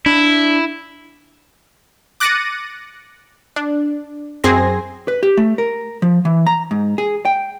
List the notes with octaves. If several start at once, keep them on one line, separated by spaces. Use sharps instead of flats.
D4 E4
D6 F#6 A6 A#6 C#7 D#7
D4
F#2 C4 G#4 G#5 C6 A#6
B4
G4
A3
A#4
F3
E3
A#5
G#2
G#4
G5